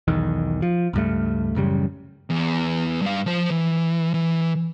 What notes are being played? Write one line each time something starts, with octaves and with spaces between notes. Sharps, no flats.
B1 E2 D#3
F3
C#2 G2 A3
A1 F#2 C#3 G3
E2
G2 F5
F3 C5
E3
E3